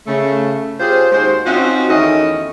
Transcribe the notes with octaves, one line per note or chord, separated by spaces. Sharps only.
C#3 A3
C#4 F4 G4 G#4 C5
D#2 G#3 F#4 C5
C4 C#4 D#4 F4 F#4
E2 D#3 A3 C#4 E4 D#5